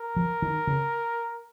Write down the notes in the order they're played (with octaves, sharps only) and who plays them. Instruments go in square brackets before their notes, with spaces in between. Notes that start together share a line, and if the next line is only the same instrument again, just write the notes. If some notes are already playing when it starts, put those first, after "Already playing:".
Already playing: [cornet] A#4
[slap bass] F3
D#3
C#3